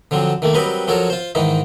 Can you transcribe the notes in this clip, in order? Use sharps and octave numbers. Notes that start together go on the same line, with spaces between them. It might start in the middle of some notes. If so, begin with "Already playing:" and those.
D3 F3 F#3 C4
D#3 A3 A#3
F#3 G3 C4 A#4 B4 D#5
F3 F#3 F#4 A4 A#4 C#5
F4 C5
G#2 D#3 E3 D#4